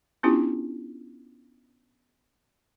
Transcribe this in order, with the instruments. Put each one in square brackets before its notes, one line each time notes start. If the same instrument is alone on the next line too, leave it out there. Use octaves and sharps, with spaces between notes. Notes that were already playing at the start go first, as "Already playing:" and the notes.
[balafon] B3 C#4 D4 E4 F4 G4